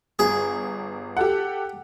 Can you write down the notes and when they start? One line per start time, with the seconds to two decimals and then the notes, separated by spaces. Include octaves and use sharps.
0.19 G1 G#4
1.17 G4 A4 F#5